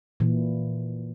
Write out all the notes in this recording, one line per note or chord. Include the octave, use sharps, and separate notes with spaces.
A#2 E3